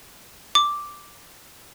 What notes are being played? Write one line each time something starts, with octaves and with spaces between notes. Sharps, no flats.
D6